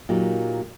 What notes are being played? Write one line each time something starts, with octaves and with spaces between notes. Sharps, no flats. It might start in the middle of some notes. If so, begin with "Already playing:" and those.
A#2 F#3 A#3 D#4 G4